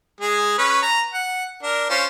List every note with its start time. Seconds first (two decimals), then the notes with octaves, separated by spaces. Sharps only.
0.21 G#3 G#4
0.58 C#4 B4 C#5
0.82 A#5
1.14 F#5
1.63 D4 A#4
1.90 C#4 F4 C5